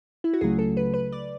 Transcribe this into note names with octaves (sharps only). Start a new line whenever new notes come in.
E4
F#4
C#2 C#3 F#3 A3 G#4
A4
B4
B4
D5